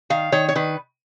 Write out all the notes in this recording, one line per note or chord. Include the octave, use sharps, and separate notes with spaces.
D#3 F5
D#3 C#5
C#5
D#3 B4